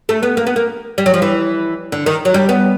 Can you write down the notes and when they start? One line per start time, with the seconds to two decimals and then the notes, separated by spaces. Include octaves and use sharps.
0.09 A3
0.23 B3
0.37 A#3
0.47 B3
0.56 A#3
0.98 G3
1.06 F#3
1.14 F3
1.22 E3
1.92 D3
2.06 D#3
2.25 F#3
2.34 G3
2.49 B3